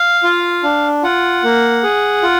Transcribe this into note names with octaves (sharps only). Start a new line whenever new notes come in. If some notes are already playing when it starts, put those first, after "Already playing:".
Already playing: F5
F4
D4
F4 F#5
A#3
G#4
F4